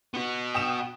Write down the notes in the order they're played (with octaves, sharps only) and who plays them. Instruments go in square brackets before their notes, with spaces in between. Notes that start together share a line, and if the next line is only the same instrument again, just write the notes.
[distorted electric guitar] B3 F#4
[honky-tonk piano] G5 D#6 E7